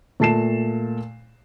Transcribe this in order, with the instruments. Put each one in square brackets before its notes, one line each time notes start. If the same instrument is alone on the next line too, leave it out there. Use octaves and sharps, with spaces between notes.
[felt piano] A#2 A3 A5 C7 E7